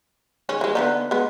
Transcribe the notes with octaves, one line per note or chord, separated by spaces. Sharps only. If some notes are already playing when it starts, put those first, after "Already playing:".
D#3 G#3 C#4
E3 G#3
D3 B3 D#4
G#3 B3